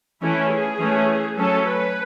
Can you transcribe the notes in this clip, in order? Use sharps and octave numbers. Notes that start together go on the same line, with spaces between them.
E3 A3 C#4 E4
G#4
E3 A3 C#4
F#3 A3 C#4 A4
B4